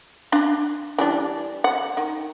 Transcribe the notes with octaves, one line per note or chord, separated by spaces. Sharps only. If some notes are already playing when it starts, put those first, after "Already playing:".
D4 F5
E3 G3 D4
F#5
D#3